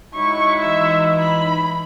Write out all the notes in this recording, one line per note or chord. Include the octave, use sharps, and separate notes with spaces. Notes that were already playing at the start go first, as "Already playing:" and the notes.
F#3 G#3 D#4 E4 C#6
E3 E5
B5